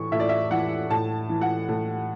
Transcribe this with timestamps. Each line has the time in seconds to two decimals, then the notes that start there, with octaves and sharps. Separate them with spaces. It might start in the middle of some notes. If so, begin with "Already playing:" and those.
Already playing: A2 E3 C#6
0.12 A2 E5
0.20 D5
0.29 E5
0.51 E3 F#5
0.90 A2 A5
1.29 E3
1.41 F#5
1.68 A2